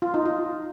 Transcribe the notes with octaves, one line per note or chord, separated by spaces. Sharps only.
F4
D#4
F4